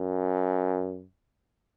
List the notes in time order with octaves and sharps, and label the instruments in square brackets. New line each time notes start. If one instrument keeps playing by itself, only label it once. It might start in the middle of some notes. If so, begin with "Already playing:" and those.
Already playing: [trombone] F#2